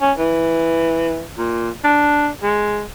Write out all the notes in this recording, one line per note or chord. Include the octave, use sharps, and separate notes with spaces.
C#4
E3
A#2
D4
G#3